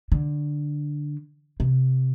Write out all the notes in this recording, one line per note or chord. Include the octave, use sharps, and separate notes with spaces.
D3
C3